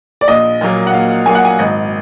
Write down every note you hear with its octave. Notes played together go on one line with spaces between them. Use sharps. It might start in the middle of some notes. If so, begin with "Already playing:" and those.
D5
A#1 D#5
A#2 F#3 A#3
F#5
A#1 F5
A#2 F#3 A#3 G#5
F#5
G#5
G#1 D#5